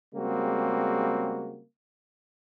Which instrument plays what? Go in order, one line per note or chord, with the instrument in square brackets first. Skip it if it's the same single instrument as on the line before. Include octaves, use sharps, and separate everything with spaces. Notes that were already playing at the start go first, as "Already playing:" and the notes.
[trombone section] C#3 G3 G#3 A#3 C4 F#4